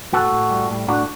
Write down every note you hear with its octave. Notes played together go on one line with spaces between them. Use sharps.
A2 F#4 A4
A2
G3
A2
A2 D4 F#4